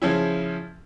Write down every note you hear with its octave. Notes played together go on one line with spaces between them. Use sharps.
C#3 F3 C#4 E4